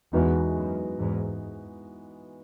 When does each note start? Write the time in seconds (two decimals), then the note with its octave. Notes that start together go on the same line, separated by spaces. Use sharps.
0.13 E2 E3 G#3 B3 D#4 F#4
0.56 F#2
0.98 E2 G#2